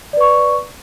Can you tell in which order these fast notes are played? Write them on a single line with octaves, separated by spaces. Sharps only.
D5 B4 C#6